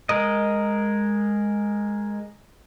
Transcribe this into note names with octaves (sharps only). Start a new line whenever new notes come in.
G#3 A#4 D#5